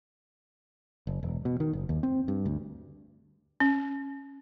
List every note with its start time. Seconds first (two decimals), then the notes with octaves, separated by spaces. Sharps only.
1.07 F#1
1.23 E1
1.45 B2
1.60 D#3
1.73 F#1
1.89 D#2
2.03 C4
2.28 G2
2.46 D2
3.60 C#4